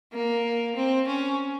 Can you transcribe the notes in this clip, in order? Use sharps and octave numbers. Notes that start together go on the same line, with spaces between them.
A#3
C4
C#4